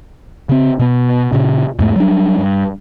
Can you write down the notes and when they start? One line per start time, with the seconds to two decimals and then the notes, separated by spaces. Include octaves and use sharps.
0.49 C#3 C4
0.79 B2 B3
1.32 A#2 C#3
1.79 E2 G#2 A3
1.96 F#3 G3 D4
2.38 G2